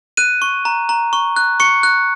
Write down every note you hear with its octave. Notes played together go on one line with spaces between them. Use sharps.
F#6 D#7
C#6
A#5
A#5
C#6
F#6
C#6 C#7
F#6